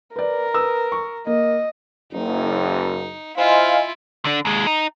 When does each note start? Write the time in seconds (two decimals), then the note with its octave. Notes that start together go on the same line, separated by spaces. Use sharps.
0.16 A#4 B4 D5
0.54 B4 D#6 E6
0.92 C#6
1.27 A#3 D#5
2.12 F#1 D#4
3.37 E4 F4 C5 D#5 F5 G#5 C6
4.25 D3 D4
4.45 D#2 G#3
4.67 D#4